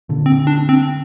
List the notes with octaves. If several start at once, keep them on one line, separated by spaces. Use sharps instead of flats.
A#2 D3
C4
D4
C4